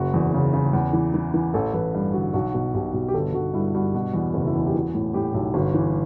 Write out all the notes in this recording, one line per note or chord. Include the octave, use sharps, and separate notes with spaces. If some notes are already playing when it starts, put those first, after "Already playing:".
Already playing: F#1 F#4
E2
C#3
C#3
E2
E3
E3
E3
A1 A4
A1 B4
G2
D3 F#4
B1 F#4
B2
B1 G4
B2
G4
G1 A4
G1 F#4
G2 E4
G2 F#4
B2 F#4
E2
F#1
E4
E2
G4
E3 F#4
A2
A2 G4
B1
G1 F#4
E3